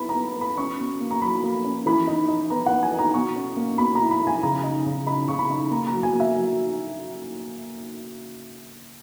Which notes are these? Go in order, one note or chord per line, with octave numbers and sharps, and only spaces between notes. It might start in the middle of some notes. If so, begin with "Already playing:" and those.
Already playing: B3 E4 B5
A#5
B3
B3 B5
C#4 C#6
B2
A#3
A#5
F#3 B5
A#3
C#4
E3 B5
D#4
D#4
B3 A#5
F#5
B3
G#5
D#4
A#5
B2 C#6
C#4
A#3
B2 B5
A#5
E4
B5
E4
G#5
C#3 A#5
D#4
C#3
D#4 B5
C#3 C#6
B5
D#4
A#3 A#5
A#5
F#3
G#5
A#3
E5
F#3